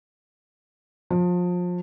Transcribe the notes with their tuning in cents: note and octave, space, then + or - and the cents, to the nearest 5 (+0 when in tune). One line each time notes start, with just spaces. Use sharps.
F3 +30